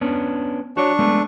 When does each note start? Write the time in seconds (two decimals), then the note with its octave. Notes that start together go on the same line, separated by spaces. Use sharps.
0.01 B3 C#4 D4
0.77 D4 F#4 C#5 C#6
0.99 G#3 A3 B3